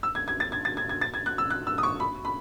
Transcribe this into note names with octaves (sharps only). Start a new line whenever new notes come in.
E6
G#6
G#6
A6
G#6
A6
G#6
G#6
A6
G#6
F#6
E6
F#6
E6
D#6
C#6
B5
B5